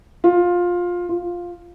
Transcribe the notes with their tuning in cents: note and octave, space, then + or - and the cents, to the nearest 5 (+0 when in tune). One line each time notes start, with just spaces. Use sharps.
F4 +15
F4 +5